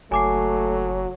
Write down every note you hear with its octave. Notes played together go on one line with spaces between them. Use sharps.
F#1 F#3 A3 G#5 D6 C7